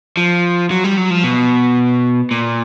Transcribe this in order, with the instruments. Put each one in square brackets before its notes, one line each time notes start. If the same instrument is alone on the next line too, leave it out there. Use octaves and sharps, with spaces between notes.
[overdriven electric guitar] F3
F#3
G3
F#3
F3
B2
A#2